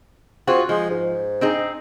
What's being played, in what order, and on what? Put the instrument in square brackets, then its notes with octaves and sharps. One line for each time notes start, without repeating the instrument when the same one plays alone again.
[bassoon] C4 [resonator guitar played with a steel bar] F4 F#4 G#4
[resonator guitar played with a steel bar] F3 [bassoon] G#3
[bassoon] G#2
[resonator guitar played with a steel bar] C4 D#4 G#4